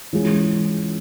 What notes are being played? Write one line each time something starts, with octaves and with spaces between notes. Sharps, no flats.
E3 G#3 C#4 F4 G#4